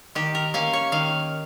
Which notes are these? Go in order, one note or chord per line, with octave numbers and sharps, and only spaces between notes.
D#3 G4
A#4
A#3 C#4 F5
C#5
D#3 F5